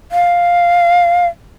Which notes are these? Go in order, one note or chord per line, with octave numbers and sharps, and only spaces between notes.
F5